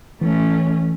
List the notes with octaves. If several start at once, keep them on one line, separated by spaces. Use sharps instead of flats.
E3 A3 C#4